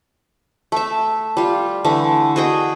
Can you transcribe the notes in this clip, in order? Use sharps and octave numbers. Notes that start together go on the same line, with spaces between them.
A3 E5
G3 F4
D3 E3 A3
F#4 G#4 D#5 G5